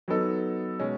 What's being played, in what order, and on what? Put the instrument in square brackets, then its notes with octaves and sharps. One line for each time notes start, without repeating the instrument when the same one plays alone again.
[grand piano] F#3 B3 D#4 A4
B2 G#3 C#4